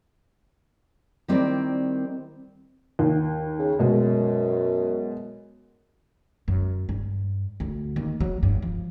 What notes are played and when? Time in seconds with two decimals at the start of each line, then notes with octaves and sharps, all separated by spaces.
1.28 D#3 G3 C4 E4 A#4 D5
2.99 D#2
3.59 C#3
3.79 F#2 B2 G#3
6.48 F#2
6.89 G2
7.60 D2
7.96 D#2
8.20 F#3
8.43 G2
8.62 F3